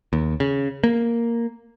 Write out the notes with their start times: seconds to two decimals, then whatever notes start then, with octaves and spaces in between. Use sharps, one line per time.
0.13 D#2
0.40 C#3
0.84 A#3